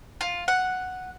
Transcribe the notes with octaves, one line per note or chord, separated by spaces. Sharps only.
F4
F#5